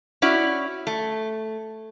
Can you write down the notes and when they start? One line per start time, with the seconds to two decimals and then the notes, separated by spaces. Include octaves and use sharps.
0.22 C#4 E4 F#4 D5
0.87 A3